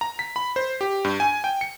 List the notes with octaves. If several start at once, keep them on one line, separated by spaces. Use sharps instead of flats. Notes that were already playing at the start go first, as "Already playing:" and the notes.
A#5
B6
B5
C5
G4
G2
G#5
G5
C#7